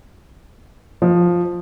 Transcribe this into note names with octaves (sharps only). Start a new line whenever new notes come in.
F3